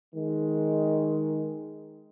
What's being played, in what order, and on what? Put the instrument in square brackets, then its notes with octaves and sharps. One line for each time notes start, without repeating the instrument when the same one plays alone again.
[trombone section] D#3 G#3